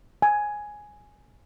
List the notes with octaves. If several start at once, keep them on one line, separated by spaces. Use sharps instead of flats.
G#5